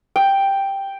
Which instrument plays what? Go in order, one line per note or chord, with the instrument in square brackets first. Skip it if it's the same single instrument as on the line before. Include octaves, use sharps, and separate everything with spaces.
[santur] G5